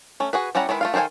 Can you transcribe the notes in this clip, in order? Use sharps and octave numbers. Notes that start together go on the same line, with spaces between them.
A3 C#4
F#4 G#4 B4
G3 C#4 E4 F#5 A#5
D#3 G#3 E4 B4
A3 F4 F5
D#3 A4 C5 F5 G#5